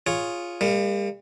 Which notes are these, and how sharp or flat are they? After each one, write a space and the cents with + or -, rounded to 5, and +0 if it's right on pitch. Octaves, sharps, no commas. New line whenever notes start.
F4 +0 G#4 +0 C#5 +0
G3 +40 A#3 -25